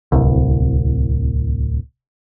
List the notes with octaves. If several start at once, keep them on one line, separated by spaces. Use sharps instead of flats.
D1 C2